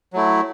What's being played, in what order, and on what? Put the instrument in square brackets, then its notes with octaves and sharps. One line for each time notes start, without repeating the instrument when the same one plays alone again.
[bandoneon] F#3 A3 E4